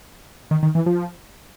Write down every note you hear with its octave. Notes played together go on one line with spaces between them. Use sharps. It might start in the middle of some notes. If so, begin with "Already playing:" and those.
D#3
D#3
E3
F3